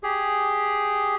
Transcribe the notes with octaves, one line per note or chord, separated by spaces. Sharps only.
G4 G#4